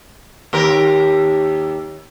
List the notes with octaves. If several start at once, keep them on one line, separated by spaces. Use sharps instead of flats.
D#2 G4 A#4